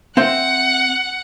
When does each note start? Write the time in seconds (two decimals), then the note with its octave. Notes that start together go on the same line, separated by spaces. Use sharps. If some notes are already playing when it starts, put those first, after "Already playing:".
0.17 C4 E5 F#5 G5